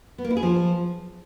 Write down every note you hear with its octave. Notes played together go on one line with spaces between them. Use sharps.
B3
A#3
E4
G#4
F3